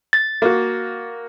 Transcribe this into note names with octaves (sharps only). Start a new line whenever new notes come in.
A6
A#3 F#4